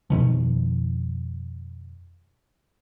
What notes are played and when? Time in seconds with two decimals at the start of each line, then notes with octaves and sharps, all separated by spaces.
0.10 F2 B2 D#3 F3